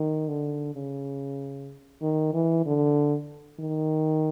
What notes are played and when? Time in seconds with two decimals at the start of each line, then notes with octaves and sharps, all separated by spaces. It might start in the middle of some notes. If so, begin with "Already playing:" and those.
Already playing: D#3
0.28 D3
0.75 C#3
2.02 D#3
2.34 E3
2.66 D3
3.60 D#3